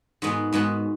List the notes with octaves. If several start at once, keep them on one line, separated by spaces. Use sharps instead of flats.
G#2 G#3 B3 F#4 B4
G#2 G#3 B3 F#4 B4